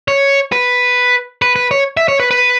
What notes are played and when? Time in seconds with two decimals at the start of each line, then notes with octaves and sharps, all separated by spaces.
0.08 C#5
0.52 B4
1.42 B4
1.56 B4
1.71 C#5
1.97 E5
2.08 C#5
2.20 B4
2.31 B4